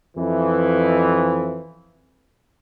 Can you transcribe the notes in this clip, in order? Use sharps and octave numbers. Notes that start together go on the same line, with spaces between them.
F2 E3